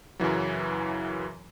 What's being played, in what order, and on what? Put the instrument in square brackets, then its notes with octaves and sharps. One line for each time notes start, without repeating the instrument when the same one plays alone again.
[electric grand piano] F#2 C#3 E3 F#3